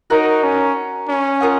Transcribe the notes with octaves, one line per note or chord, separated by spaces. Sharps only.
D#4 F#4 A#4 C#5 F#5
C#4
C#4
F4 A#4 D#5 F#5